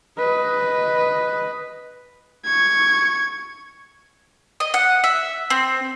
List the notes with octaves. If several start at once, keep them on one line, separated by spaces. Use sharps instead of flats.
B4 D#5
C#6 G#6
D#5
F#5
E5
C4